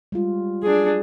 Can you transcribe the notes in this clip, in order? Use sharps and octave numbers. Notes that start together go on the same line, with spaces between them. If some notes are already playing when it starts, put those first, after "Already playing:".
G3 G#3 F4
F#3 D4 G#4